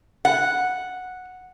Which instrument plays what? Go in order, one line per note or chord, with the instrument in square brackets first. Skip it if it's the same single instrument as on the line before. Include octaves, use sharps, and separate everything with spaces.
[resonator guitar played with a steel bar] F#5